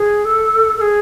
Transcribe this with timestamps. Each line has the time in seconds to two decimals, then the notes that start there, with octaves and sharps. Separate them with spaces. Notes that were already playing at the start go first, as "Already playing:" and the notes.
Already playing: G#4
0.25 A4
0.77 A4
0.81 G#4